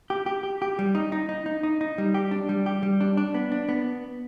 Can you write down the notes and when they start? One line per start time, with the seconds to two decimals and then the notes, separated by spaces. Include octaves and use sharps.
0.10 G4
0.26 G4
0.43 G4
0.62 G4
0.79 G3
0.95 D#4
1.12 D#4
1.29 D#4
1.46 D#4
1.63 D#4
1.81 D#4
1.98 G3
2.14 G4
2.31 D4
2.49 G3
2.66 G4
2.83 G3
3.00 D4
3.17 D4
3.34 B3
3.52 D4
3.69 B3